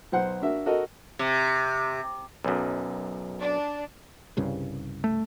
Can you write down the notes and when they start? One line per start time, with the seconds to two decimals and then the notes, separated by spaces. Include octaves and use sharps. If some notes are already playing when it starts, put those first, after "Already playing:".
0.12 B1 C5 F#5
0.41 D4 F#4 A#4 E5
0.66 F#4 A4 A#4 D#5
1.19 C3
2.44 B1 F#2
3.40 D4
4.37 C2 G2 C#3
5.04 A3